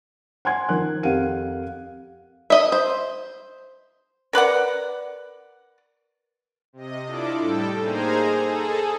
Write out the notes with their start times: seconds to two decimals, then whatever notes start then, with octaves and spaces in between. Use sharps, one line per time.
0.45 F#5 G#5 C6 G#6
0.69 D#3 F3 A#4 F#6
1.03 F2 G4 A#4 F5 F#5 D#7
2.50 D#5 E5
2.72 C5
4.33 A#4 B4 D5 F#5
6.73 C3 D#5
7.06 D4 E4 F4 A4 D5 D6
7.39 A2 G3 A4 G5
7.79 A#3 D#4 G#4 C5 G#5 A#5
8.37 G#4 A4